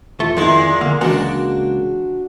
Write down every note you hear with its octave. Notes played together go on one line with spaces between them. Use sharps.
E2 A3 F4
F2 A#2 D#3 G#3 E4
D3 A#3
C#2 E3 G#3 A#3 D4 F#4